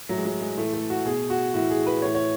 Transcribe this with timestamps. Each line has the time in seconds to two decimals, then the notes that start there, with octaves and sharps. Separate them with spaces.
0.09 A2 E3 F#3
0.18 G#3
0.25 F#3
0.41 G#3
0.57 A2 E3 A3
0.73 A3
0.90 F#4
1.06 B2 G#4
1.30 F#4
1.54 A2 E3 F#4
1.70 G#4
1.87 B4
2.02 A2 E3 C#5
2.15 C#5